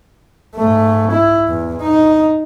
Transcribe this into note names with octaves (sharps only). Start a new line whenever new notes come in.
G#2 A3
E4
E2
D#4